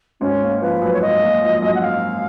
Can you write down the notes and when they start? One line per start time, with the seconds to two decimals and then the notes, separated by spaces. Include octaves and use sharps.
0.21 G#1 C#4
0.42 A#3
0.62 F3 B4
0.82 F#2
0.93 C#5
1.01 G#1 D#5
1.21 A#3
1.41 F3
1.62 F#2
1.75 F#5
1.81 F5